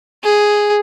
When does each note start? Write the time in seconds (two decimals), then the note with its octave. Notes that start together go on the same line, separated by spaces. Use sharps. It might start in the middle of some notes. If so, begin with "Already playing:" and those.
0.24 G#4